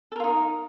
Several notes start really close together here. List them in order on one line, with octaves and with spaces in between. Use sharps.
A4 A#4 F4 D#4